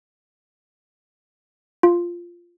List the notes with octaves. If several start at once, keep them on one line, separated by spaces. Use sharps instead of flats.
F4